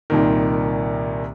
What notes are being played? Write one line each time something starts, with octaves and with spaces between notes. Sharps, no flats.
C2 A#2 D#3